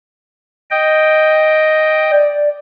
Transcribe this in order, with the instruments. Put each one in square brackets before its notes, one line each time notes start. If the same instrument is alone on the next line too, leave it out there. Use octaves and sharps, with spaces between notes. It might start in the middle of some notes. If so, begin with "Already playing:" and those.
[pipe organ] D#5 G5
[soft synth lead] D5